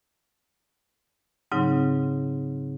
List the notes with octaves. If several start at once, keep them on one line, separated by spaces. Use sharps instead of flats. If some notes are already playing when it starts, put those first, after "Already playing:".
G#2 C#3 F#3 C4 D#4